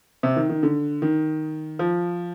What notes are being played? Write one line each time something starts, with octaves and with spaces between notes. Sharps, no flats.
C3
D#3
D#3
D3
D#3
F3